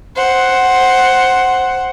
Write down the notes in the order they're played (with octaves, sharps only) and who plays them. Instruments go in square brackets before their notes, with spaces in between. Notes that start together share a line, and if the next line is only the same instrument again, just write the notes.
[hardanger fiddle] C5 F#5